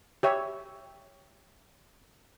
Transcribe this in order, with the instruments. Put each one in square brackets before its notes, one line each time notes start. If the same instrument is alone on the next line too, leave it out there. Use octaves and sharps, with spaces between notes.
[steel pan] G4 C#5 E5